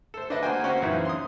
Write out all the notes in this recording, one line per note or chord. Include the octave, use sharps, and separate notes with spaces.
A4 C5
D4 B4 C5 D#5
A#3 F#4 C5 G5 G#5
C4 C#4 F#4 C5 C#5
A#1 F#2 E3 D#4 E5 F#6
C6 D#6